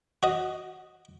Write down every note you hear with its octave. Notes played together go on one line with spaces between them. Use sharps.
F#4 D#5